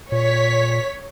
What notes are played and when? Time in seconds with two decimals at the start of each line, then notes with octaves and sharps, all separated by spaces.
0.12 A#2 C#5 B6